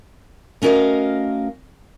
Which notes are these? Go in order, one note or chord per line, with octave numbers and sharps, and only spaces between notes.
A3 C#4 F#4 A#4 D#5 F5